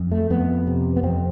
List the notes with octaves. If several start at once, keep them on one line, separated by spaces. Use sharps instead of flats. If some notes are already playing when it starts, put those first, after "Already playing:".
Already playing: F2
A3
F2 B3
C3
B3
F2 C4